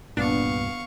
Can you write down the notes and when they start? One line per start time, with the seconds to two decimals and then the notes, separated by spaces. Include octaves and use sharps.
0.17 C2 G2 A#2 B3 D4 F5 C#6